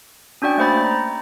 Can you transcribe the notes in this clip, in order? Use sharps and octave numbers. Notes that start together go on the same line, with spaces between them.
C#4 D4 F#4 D5 G5
A3 A#3 C5 B5 A6
A#5